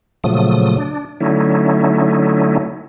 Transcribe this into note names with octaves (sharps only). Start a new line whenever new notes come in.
A#2 C#3 F3 F#3 A3 D#6
D4
D3 F#3 A3 C#4 D#4 E4